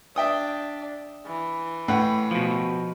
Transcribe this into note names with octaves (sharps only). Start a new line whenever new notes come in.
D4 E5 G5 D#6
E3
A2 B4 F#5
B2 F3